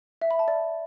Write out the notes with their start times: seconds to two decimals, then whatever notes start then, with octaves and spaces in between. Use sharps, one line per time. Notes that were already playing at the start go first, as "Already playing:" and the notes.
0.22 E5
0.31 B5
0.39 A5
0.48 D5